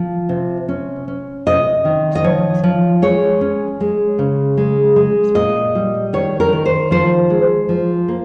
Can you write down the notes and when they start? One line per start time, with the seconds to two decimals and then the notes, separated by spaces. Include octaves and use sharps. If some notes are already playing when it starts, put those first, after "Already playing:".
Already playing: F3
0.29 C3
0.69 C#4
1.08 C#4
1.47 C3 D#5
1.85 D#3
2.15 D#5
2.24 F3 C#5
2.64 F3
3.02 G#3 C#5
3.41 C#4
3.81 G#3
4.19 C#3
4.57 G#3
4.96 G#3
5.35 A#2 D#5
5.75 G3
6.13 D#3 C#5
6.40 A#4
6.53 D#3
6.66 C5
6.91 F3 C5
7.30 G#3
7.69 F3
8.08 A#3